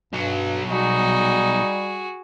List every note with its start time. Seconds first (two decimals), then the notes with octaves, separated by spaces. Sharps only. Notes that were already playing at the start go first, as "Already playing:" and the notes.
0.13 B1 G2 F#3
0.70 G3 D#4 F#4 G#4